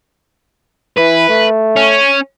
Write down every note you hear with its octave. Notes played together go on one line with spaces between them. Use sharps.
E3 B4
A3
C#4